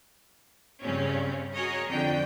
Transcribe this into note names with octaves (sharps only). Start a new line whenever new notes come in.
G2 C#3 C4 C#4
F#4 G#4 A#4 C#5 D#5
F2 D3 G5